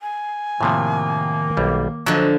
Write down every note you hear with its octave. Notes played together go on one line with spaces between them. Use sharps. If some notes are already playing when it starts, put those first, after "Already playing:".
G#5
A2 C3 D#3 F3 A#3
B1 G3
D3 F3 F#3 D#5